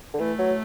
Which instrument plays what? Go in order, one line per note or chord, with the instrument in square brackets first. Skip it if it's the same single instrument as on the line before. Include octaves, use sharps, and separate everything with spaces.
[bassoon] D3
[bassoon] E3 [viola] A3
[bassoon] F#3